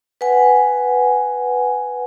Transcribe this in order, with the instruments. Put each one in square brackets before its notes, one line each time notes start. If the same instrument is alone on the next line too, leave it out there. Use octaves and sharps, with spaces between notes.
[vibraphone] B4 F#5 G#5